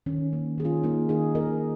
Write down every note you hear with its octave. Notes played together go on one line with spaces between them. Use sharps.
D#3 C#4
A#3
D#3 G#4
C#4 F4
A#3 D#4
D#3 D#4 G#4
A#3 A#4 D#5